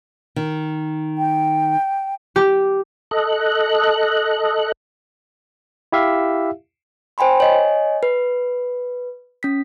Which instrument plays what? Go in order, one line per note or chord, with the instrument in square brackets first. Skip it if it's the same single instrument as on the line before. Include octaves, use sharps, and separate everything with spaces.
[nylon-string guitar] D#3
[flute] G5
[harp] G4
[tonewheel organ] A4 D#5 F#6
[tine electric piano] E4 G4 E5 F5
[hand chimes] C5 G5 G#5 B5 C6
C#5 D#5 G#5
B4
C#4 B6